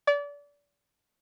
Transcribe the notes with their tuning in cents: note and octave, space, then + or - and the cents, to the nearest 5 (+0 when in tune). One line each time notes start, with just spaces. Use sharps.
D5 -30